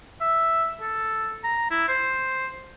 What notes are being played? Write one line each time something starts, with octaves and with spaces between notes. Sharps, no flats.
E5
A4
A#5
E4
C5